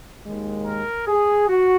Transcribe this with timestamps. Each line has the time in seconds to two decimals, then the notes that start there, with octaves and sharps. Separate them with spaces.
0.23 D#2 D#3 G#3
0.65 A#4
1.07 G#4
1.48 F#4